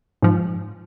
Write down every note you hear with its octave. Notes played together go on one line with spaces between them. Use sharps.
G#2 F3